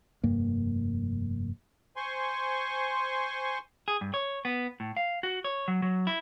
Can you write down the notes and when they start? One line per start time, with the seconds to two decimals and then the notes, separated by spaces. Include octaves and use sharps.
0.23 F1 G2 A#3
1.96 C5 G#5 C6 C#6
3.88 G#4
4.01 G2
4.14 C#5
4.45 B3
4.80 A2
4.97 F5
5.23 F#4
5.44 C#5
5.68 F#3
5.82 F#3
6.07 E4